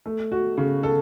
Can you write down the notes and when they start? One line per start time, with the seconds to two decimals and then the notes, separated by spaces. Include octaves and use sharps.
0.06 A3
0.32 F#4
0.57 C#3
0.83 A4